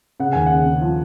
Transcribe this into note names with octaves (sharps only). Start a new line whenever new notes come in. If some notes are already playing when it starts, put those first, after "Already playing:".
C#3 F#5
D#2 G#5
F#5
C#3
C#3
F3